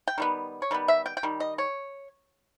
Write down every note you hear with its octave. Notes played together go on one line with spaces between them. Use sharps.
G5
D#3 G3 B3
C#5
D#3 G3 B3
E5
G5
G5
D#3 G3
D#5
C#5